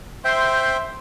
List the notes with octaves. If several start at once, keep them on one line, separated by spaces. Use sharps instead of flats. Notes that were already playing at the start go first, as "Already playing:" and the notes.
C5 E5 G5 C6